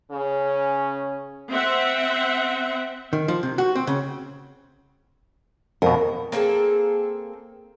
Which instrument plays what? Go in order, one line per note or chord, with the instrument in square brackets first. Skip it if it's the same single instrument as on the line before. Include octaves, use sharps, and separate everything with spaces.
[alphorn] C#3 [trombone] C#4
[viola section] C4 E5 F#5
[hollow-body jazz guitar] D#3
F3
C3
F#4
C4
C#3
[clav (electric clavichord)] F2 B2 [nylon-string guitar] A#4
[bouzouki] A#3 C4 G#4 A4